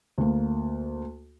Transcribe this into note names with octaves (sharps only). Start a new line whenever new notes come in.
D2 A#3